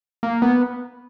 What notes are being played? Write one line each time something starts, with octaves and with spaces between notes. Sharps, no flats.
A#3
B3